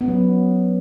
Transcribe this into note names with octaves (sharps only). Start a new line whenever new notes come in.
F#3 B3 C#4